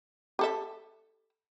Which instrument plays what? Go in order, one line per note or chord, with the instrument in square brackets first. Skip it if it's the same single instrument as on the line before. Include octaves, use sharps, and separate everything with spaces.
[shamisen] G4 A4 E5